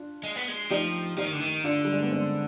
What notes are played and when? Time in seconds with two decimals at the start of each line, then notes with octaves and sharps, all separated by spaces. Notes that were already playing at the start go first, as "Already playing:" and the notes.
Already playing: D4 F4
0.23 G#3
0.36 B3
0.48 G#3
0.71 F3 D#4 G4
1.17 F3 D#4 G4
1.25 D#3
1.33 D3
1.41 D#3
1.64 D3 D4 F4
1.84 G3
1.93 G#3
2.02 B3
2.11 G#3 C4